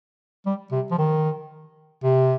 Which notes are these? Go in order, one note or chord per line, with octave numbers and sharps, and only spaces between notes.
G3
C3
F3
D#3
C3